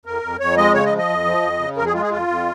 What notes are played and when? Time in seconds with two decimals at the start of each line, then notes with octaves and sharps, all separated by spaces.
0.06 F2 A#4
0.23 F2
0.40 F2 C#5
0.57 G#3 D#5
0.74 C#3 C#5
0.86 D#5
0.91 F3
0.98 D#5
1.09 F2
1.25 F3
1.42 F2
1.59 C#3
1.77 F2 A#4
1.85 G#4
1.94 G#3 F4
2.02 G#4
2.11 F2 F4
2.28 F2